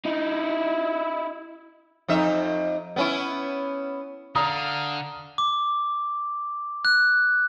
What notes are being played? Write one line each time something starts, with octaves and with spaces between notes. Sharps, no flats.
D#4 E4
F2 D#4 E5
B3 C#4 E4
D3 F5 A#5 D#6 F6
D6
F#6